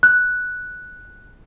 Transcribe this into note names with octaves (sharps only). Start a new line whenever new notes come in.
F#6